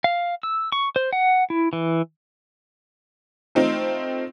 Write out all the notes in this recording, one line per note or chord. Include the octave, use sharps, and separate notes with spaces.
F5
E6
C#6
C5
F#5
E4
E3
A3 C4 D#4 F4